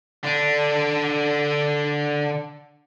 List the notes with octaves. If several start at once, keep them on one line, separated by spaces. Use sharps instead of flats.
D3 D4